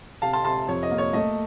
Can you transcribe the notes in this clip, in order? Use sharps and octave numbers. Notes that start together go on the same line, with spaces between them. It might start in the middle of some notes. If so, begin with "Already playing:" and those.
C3 F5 A5
A5 C6
C3 A5 C6
F2 C#5
D#5
A#3
C#5
A3 D#5